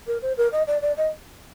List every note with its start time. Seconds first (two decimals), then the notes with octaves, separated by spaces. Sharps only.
0.07 A#4
0.22 C5
0.37 A#4
0.52 D#5
0.67 D5
0.82 D5
0.97 D#5